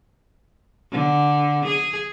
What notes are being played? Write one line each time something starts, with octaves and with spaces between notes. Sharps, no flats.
D3
G#4